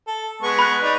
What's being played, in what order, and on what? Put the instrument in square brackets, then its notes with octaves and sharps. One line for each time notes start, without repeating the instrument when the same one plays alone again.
[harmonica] A4
G#3 B3 C#6
[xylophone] B5 F#6
[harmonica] D#4 D5